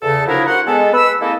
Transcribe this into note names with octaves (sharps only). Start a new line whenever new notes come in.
E2 C#3 A4
F3 F#3 D4 E4 G#4 A#4
F#4 A#4 C5 F#5
G#3 B3 A4
B4 E6
G#3 A#3 C4 E4 A4 D#5